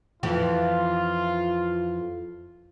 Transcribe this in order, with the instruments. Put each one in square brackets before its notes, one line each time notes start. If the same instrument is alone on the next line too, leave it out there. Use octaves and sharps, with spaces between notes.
[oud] F2 E3 G4 [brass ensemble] F4